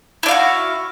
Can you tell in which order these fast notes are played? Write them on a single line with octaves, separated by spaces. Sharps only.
E4 D4 F5 F#4